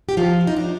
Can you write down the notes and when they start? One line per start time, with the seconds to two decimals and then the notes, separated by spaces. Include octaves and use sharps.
0.09 G4
0.17 F3 F4
0.41 C3
0.47 D#4
0.57 D4